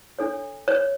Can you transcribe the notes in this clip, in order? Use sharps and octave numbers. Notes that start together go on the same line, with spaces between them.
D4 A4 C#5
C#5